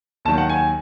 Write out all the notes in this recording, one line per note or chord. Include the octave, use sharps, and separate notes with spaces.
D#2 D#3 F#3 A5
F#5
G#5